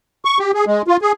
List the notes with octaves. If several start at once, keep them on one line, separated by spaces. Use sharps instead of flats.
C#6
G4
G#4
G#3
F4
G#4